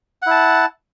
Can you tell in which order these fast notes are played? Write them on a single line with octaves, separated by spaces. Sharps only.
F#5 E4 A5